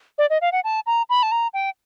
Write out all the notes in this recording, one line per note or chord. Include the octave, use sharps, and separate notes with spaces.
D5
D#5
F5
F#5
A5
A#5
B5
A5
A#5
G5